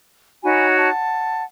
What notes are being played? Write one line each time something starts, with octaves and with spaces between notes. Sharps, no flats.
D#4 F#4 C#5 G#5 B5
F#5 A5